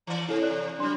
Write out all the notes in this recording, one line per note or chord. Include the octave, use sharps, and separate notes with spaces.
E3 D5
C3 E4 A4
D5 F#6
F#3 G3 D4 C6